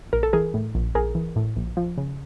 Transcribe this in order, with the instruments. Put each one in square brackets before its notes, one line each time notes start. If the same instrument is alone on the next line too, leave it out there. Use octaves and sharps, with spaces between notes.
[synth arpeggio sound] A#1 A#4
A4
E3 G#4 A#4
A2
A#1
A#1 G#4 A#4
E3
A2
A#1
F3
C#3